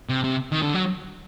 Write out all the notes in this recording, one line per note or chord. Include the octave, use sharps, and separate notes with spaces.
C3
C3
D#3
D3
F#3